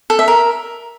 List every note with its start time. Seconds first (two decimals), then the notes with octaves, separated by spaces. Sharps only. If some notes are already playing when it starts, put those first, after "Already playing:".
0.10 A4
0.19 E5
0.28 A#4